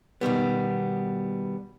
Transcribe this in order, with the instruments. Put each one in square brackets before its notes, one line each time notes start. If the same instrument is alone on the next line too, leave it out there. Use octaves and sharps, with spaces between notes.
[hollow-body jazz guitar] B2 D#3 G3 B3